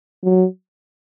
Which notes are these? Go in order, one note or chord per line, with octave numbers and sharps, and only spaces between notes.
F#3